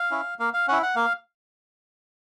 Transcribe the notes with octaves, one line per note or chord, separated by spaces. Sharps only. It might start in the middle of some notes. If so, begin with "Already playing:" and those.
Already playing: F5
C#4 E4
A#3 F5
F5
C#4 E4 F#5
F#5
A#3 F5